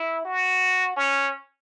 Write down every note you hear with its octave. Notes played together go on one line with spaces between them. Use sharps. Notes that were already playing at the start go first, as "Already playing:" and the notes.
Already playing: E4
F#4
C#4